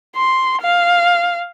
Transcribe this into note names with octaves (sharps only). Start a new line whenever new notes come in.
C6
F5